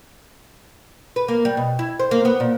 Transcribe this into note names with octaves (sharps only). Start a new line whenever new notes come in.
B4
A#3
G3
B2
E4
C5
A#3
B3
A#2